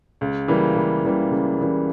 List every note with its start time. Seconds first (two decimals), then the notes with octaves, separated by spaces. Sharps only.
0.21 C#2
0.48 C#3 E3 G3 A#3
0.75 C#2
1.03 C#3 E3 G3 A#3
1.31 C#2
1.58 C#3 E3 G3 A#3